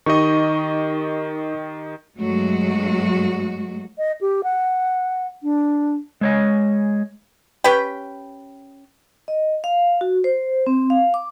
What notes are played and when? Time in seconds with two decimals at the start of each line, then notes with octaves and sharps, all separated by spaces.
0.06 D#3 D#4 G4 D#5 C#6
2.18 G2 F#3 G#3 A3 F#4
3.98 D#5
4.21 G4
4.44 F#5
5.43 D4
6.21 G#3 C#5 D#5
7.64 C#4 G4 B4 G5
9.28 D#5
9.64 F5
10.01 F#4
10.24 C5
10.67 C4
10.90 F5
11.14 D6